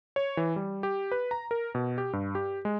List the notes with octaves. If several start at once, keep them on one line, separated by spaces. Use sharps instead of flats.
C#5
E3
G3
G4
B4
A#5
A#4
B2
G4
G2
G4
G#3